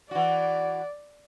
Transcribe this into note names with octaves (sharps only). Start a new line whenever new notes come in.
E3 F#4 D5